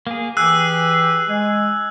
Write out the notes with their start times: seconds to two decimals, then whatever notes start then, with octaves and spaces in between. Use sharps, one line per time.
0.07 A#3 G#4
0.37 E3 G4 G#4 E6 F#6
1.29 G#3 G#5